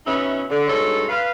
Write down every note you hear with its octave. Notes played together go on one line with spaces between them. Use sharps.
B2 B3 C#4 D#4 E4
D3
G2 B2 G#3 D#4 A4 C#5
B4 F5